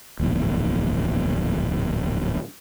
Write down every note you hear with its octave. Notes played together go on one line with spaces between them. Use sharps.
D1 A#1 E2 G#2